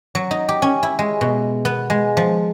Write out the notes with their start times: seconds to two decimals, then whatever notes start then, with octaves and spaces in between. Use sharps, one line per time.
0.15 F#3
0.31 D#4
0.49 G4
0.62 C#4
0.83 E4
0.99 G#3
1.21 B2
1.65 B3
1.90 G#3
2.17 F3